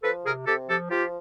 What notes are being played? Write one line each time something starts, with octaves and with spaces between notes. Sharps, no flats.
F3 A4 B4
C3 G#4 A#4
C3 G4 A4
F3 G4 A4
F3 F4 G4